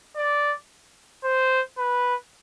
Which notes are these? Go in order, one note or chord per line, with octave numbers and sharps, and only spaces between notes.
D5
C5
B4